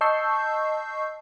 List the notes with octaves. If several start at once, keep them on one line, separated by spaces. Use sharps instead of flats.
D#5 A5 C#6 E6 G6 C7